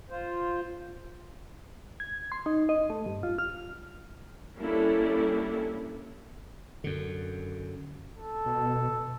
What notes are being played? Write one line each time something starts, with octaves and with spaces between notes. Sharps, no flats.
F4 C5
G#6
C6
D#4
D#5
A3
G2
F4
F6
G3 A#3 C#4 D4 E4 A4
F#2 D3
A4
B2